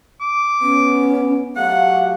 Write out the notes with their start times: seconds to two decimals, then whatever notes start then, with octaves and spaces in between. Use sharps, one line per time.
0.21 D6
0.62 B3 C#4
1.56 F#3 A3 G4 F5 F#5